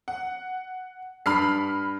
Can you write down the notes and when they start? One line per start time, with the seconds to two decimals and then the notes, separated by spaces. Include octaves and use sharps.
0.08 F#5
1.26 G2 B5 F6 C7